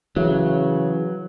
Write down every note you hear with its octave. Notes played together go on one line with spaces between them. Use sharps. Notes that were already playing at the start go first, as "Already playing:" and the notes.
C#3 E3 F#3